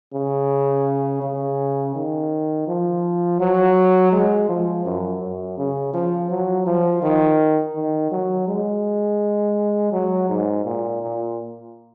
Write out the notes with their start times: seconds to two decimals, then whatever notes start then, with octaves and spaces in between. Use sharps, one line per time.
0.14 C#3
1.22 C#3
1.95 D#3
2.67 F3
3.40 F#3
4.12 G#3
4.49 F3
4.85 F#2
5.21 F#2
5.58 C#3
5.93 F3
6.30 F#3
6.66 F3
7.02 D#3
7.75 D#3
8.11 F#3
8.47 G#3
9.92 F#3
10.29 G#2
10.65 A#2
11.02 A#2